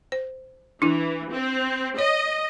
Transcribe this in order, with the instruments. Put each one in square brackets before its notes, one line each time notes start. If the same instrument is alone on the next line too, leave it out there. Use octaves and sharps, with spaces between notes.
[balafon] C5
[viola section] E3 [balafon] D4 E4
[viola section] C4
[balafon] C#5 [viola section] D#5